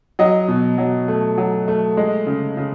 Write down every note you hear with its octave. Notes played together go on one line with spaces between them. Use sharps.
F#3 D#5
B2
F#3
A3
F#3
A3
G#3
C#3
C#3